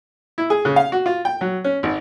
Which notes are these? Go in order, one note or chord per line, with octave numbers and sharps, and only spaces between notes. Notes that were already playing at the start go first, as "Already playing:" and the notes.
E4
G#4
C#3
F5
F#4
F4
G5
F#3
C#4
G#1